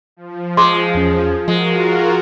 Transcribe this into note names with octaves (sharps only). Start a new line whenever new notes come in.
F3
G#3 C6 D6
E2 C#4
F3 G#3 F4 F#4 A#4